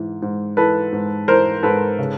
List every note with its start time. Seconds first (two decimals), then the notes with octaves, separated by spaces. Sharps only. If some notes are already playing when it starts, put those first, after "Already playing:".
Already playing: G#2 E3
0.22 G#2
0.57 E3 A4 B4
0.93 G#2
1.28 E3 A#4 C5
1.63 G#2 A4 B4
1.99 C#3